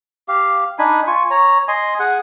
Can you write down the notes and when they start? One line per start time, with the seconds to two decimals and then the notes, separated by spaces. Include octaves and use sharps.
0.28 G4 F5
0.79 D4 D#4 G#5 B5
1.07 F4 G#5 C#6
1.30 C#5 A#5
1.68 D#5 G#5 C6
1.99 G#4 F#5 G#5